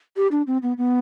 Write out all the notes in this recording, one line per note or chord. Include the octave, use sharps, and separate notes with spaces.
G4
D4
C4
B3
B3